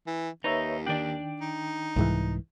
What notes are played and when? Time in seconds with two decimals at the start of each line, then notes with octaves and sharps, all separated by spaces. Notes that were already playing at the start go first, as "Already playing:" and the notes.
0.07 E3
0.44 D#2 D#4 B4 C#5 E5
0.86 D#3 D4 D5 G5
1.41 D#4
1.96 C2 G#2 E3